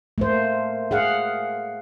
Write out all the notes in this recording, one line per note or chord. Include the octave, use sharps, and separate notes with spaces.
A3 A#3 C5
G#4 F5 F#5